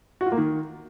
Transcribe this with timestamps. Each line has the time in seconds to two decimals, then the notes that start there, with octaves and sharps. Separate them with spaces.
0.21 F#4
0.26 F4
0.32 A#3
0.37 D#3